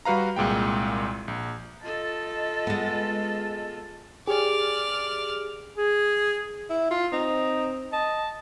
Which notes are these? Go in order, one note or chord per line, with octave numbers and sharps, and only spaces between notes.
G3 F#4 B4 F5 A#5
C2 A#2 G#3 G5
A#1
F4 A4 D#5 A5
G#3 B3
G4 G#4 D5 F6
G#4
E4
F4
C4 D#4
D#5 A5